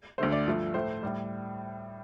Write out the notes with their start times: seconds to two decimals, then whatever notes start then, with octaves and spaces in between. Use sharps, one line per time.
0.18 D2 D3 A3 C5
0.32 D5
0.47 G2 F3 A3
0.74 A2 A3 C5
1.03 A2 G3